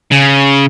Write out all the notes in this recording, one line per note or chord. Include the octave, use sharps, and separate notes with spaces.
C#3